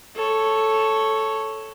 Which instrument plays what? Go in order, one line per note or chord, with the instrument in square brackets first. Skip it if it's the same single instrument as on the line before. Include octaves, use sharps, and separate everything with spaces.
[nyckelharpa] A4 C#5